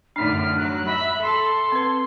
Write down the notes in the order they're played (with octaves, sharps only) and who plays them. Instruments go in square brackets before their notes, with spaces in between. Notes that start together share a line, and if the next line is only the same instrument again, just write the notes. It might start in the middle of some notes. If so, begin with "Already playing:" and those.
[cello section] F#2 A2 D3 [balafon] D4 D#4 [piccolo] F6
[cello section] F#3 [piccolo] F#6
[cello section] E5 [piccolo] B5
[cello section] A4 [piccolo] C6
[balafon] C4 B4